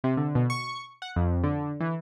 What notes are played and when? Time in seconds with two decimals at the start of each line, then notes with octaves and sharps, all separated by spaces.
0.04 C3
0.17 D3
0.35 B2
0.50 C#6
1.02 F#5
1.16 F2
1.44 D3
1.80 E3